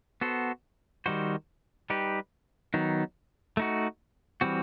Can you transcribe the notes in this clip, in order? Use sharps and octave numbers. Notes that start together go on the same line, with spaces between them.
B3 F#4 A4 C5
D#3 G3 D#4 F#4 C5
G3 D#4 G4 B4
D#3 F#3 B3 D#4
A3 D#4 F#4
E3 G3 C4 F#4